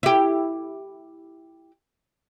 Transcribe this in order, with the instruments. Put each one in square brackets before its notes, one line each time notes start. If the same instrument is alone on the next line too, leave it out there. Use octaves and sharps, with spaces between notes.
[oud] E4 G4